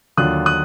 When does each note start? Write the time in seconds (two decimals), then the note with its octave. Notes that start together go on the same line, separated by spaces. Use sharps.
0.17 D#2 D3 F#3 D4 F4 D#6 F#6
0.46 D#6 F#6